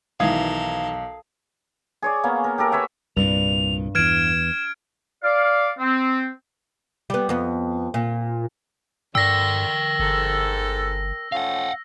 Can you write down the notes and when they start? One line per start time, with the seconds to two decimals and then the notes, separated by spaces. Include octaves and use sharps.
0.20 B1 D#3 E3 A4 A#4 F5 D#6 G#6
2.02 G#4 C#5 D5
2.24 A#3 B3 C#4
2.44 A#4
2.58 G4 A4 A#4
2.72 B4 C#5 E5 F#5
3.16 C2 G2 A#2 F7
3.95 E2 E3 F6 G#6 D7 E7
5.23 D5 F5
5.79 C4
7.10 G3 B3
7.29 F2 B3
7.94 A#2
9.15 D2 G2 D3 A#4 G5 E6 A#6
9.99 G1 G#2 A4
11.32 F3 A3 C#4 F5 F#5